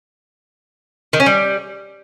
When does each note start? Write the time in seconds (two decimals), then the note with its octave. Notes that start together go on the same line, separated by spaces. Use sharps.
1.13 D#3
1.20 C#4
1.26 G3